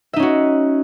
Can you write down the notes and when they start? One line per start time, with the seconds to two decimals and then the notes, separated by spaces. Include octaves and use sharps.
0.13 E5
0.16 D#4
0.19 C#4
0.22 F#4